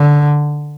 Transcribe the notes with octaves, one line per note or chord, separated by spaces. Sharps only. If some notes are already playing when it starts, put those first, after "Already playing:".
Already playing: D3